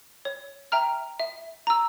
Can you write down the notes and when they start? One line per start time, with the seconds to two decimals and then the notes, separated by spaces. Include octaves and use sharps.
0.25 C#5
0.72 E5 G5 A#5 F6
1.20 E5
1.67 A#5 E6